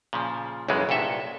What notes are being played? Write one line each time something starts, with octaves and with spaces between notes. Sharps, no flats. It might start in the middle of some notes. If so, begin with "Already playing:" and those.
A#2 C#3 F3
B1 F#2 C#3 E3 G#3
C2 G2 A#2 A4 E5